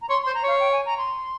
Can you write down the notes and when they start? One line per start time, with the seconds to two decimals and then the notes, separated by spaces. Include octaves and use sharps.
0.02 A#5
0.09 C#5 C6
0.23 C6
0.27 C5
0.34 A#5
0.43 C#5 F5
0.60 G5
0.72 G#5
0.86 A#5
0.98 C6